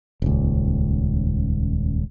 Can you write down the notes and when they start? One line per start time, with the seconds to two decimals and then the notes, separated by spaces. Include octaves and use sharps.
0.22 D#1 C#2